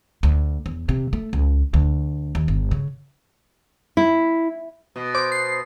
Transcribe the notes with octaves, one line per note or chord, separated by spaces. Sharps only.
D2
E2
C3
A3
C#2
D2
D#2
G1
C#3
E4
B2
C5 D6
C7